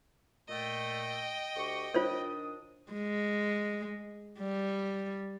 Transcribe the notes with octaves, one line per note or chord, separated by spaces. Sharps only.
A#2 A3 D#5 G5
D2 G4 C#6
D#3 D4 F4 C5 C#5 D#6
G#3
G3